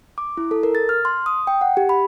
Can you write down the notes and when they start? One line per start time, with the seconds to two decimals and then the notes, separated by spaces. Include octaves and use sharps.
0.18 D6
0.37 E4
0.51 A4
0.63 A#4
0.75 A6
0.89 F6
1.05 C6
1.26 D#6
1.47 G5
1.61 F#5
1.77 G4
1.89 B5